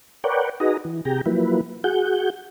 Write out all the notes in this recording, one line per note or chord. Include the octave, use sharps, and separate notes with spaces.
A#4 B4 C#5 D5 F#5 G5
D#4 F#4 G#4 B4 D#5 A#5
E3
C3 G4 G#4 G5 A#5
F3 F#3 A#3 E4 B4
F#4 G#4 F#5 G6